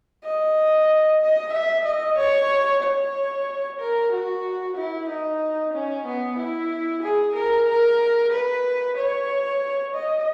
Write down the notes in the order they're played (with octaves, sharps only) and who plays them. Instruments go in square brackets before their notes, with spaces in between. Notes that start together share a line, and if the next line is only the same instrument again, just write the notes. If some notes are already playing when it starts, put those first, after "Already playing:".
[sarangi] D#5
D#5
E5
D#5
C#5
C#5
A#4
F#4
E4
D#4
C#4
B3
E4
G#4
A#4
A#4
B4
C#5
D#5